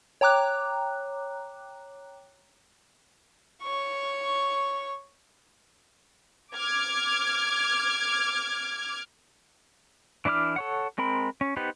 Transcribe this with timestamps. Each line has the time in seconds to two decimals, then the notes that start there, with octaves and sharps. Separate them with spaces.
0.21 C#5 G5 A#5 D6 F#6
3.63 C#5 C#6
6.53 D6 F6 G#6
10.25 E3 D4 E4 D6 F6
10.56 A4 C#5 F#5
10.98 G#3 C4 A#4 B5
11.41 C#4
11.57 B3 D#4 G4 B4 C5